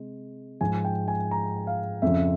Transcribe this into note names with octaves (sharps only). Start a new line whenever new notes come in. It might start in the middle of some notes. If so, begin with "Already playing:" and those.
Already playing: C3 G#3
G#2 F3 G#3 G#5
G5
G#5
A#5
F5
F2 C#3 F3 E5